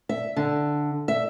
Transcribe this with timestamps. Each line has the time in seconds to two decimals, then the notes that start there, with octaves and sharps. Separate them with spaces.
0.09 E5
0.36 D3
1.08 E5